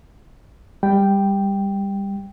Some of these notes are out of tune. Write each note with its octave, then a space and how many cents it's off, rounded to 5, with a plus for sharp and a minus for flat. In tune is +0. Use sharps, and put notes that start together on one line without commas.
G3 +20 G5 +0